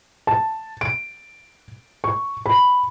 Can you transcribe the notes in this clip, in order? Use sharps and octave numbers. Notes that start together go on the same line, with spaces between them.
A5
D7
C#6
B5